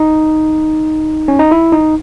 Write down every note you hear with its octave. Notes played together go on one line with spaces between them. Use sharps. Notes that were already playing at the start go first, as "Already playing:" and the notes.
Already playing: D#4
C#4
D#4
E4
D#4